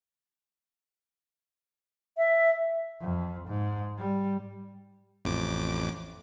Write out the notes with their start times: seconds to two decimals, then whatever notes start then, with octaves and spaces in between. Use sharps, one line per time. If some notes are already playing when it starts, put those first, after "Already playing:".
2.17 E5
3.01 F2
3.48 G#2
3.98 G3
5.25 A1 F2 D6